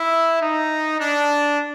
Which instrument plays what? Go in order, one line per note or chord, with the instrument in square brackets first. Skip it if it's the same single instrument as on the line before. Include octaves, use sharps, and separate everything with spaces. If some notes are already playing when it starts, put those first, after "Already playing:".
Already playing: [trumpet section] E4
D#4
D4